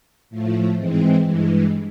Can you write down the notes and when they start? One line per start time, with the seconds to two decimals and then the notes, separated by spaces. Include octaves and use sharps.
0.30 A2 F3 A3
0.77 G#2 E3 G#3 C4
1.25 G2 E3 G#3